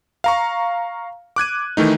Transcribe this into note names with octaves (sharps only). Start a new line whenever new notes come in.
F5 A#5 C#6
D6 F#6 G#6 D#7
D#3 E3 A3 D#4